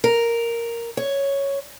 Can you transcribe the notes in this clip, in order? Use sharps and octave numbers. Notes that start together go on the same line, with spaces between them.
A#4
C#5